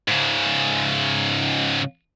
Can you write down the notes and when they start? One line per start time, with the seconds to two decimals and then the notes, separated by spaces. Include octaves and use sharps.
0.08 G#2 C#3